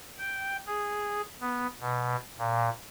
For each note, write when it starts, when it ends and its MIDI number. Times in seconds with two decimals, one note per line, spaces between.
0.18 0.57 79
0.67 1.22 68
1.41 1.67 59
1.80 2.16 47
2.38 2.70 46